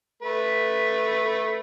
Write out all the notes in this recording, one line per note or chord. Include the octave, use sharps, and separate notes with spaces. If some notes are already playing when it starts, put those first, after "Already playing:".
A3 B4